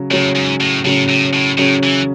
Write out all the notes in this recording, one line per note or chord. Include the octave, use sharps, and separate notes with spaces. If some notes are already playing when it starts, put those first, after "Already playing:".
Already playing: C#3 F#3 C#4
A2 C#3 F#3 C#4
G#2
A2
A2 C#3 F#3 C#4
A2
A2
A2 C#3 F#3 C#4
E3